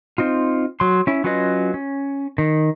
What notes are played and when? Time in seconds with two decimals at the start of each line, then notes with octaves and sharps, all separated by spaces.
0.18 C4 D#4 F4
0.80 F#3 C6
1.07 C#4 E4
1.24 F#3 C#4 F4 B4 D#5
1.74 C#4
2.38 D#3